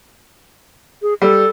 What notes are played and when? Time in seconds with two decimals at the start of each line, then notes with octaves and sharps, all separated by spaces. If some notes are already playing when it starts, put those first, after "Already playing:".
1.02 G#4
1.22 G3 A4